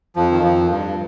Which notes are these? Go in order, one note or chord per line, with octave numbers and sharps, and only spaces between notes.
F2 F3
D#3
F2 F3
G2